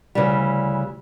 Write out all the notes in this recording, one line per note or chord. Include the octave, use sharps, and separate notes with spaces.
D2 C#3 E3 G3